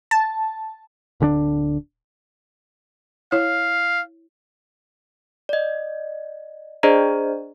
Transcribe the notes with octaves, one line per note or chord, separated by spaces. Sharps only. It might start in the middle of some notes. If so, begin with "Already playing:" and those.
A5
D1 D3 C#4 D4
E4 C#5 F5
D5 D#5
D4 G#4 C5 D5 D#5 A#5